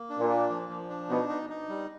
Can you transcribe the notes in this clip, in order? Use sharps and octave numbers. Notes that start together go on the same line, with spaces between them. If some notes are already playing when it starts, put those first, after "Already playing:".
Already playing: A#3
D4
A#2
A#3
F3
F3
D4
B2 D#4
D#4
D#4
G3